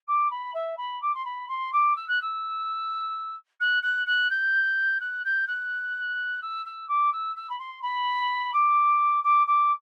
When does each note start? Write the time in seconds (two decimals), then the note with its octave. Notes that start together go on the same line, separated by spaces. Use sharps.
0.07 D6
0.30 B5
0.54 E5
0.77 B5
1.01 D6
1.14 C6
1.25 B5
1.48 C6
1.72 D6
1.96 E6
2.08 F#6
2.21 E6
3.60 F#6
3.82 F#6
4.06 F#6
4.30 G6
5.00 F#6
5.24 G6
5.47 F#6
6.41 E6
6.65 E6
6.88 D6
7.12 E6
7.36 E6
7.49 B5
7.59 C6
7.82 B5
8.53 D6
9.23 D6
9.47 D6